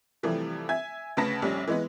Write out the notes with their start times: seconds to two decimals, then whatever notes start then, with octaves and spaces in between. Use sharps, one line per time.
0.23 C3 E3 F3 G3 A3
0.69 E5 G#5 G#6
1.17 D2 C#3 B4 A5 A#6 B6
1.42 F1 A#1 G3 C#4
1.68 E3 G#3 B3